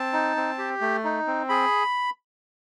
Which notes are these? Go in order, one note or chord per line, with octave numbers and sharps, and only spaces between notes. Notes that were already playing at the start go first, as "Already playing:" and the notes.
Already playing: C4 A5
D#4
C4
G4
A3
D#4
C4
G#4 B5